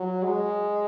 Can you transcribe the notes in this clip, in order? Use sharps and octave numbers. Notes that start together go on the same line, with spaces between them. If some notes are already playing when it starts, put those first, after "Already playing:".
Already playing: F#3
G#3